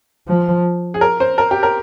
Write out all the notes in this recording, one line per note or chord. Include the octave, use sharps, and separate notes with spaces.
F3
G#4
A#4
C5
A#4
G4
A#4